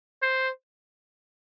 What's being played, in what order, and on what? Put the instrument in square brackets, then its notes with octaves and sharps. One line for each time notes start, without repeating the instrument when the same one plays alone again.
[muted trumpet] C5